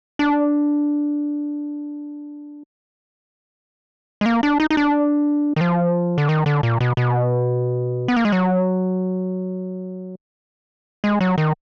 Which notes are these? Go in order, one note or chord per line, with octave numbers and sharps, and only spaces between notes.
D4
G#3
A#3
D4
D#4
D#4
D4
D#3
F3
D3
D#3
D3
A#2
B2
B2
B3
A#3
G#3
F#3
G#3
F#3
D#3